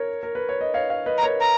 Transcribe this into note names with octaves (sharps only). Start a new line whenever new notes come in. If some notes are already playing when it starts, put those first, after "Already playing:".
Already playing: A#4 C#5
A#4
B4
C#5
D#5
C#5 F5
C#5 F5
B4 D#5
A#5
A#4 C#5
A#5